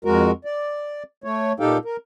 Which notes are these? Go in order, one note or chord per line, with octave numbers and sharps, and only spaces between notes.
F2 G#3 F#4 A#4
D5
A3 C#5
A#2 D#4 G4 A4 F5 G5
A#4